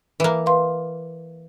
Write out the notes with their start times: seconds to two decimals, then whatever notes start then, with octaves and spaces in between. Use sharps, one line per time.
0.20 E3 A#3
0.46 B4 F5 C6